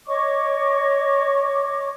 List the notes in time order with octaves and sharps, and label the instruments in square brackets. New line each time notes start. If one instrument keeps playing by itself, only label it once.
[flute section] C#5 D#5 C#6 D6